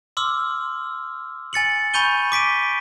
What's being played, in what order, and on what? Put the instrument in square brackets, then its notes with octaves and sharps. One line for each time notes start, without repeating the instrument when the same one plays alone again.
[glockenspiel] C6 D6 E6 F6
G#5 A6 C#7 F#7
G#5 B5 C#6 G6 D#7 G7
D6 B6 D7 D#7